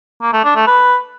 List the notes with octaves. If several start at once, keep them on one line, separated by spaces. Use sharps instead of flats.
A#3
A3
D4
A3
B4